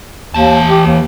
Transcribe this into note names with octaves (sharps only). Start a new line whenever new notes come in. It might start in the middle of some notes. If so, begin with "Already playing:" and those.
D#2 E3 A5
G4
D#2